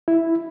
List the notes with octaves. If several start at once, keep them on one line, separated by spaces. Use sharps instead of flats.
E4